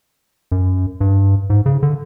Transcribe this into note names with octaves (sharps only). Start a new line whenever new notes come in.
F#2
G2
G#2
C#3
D3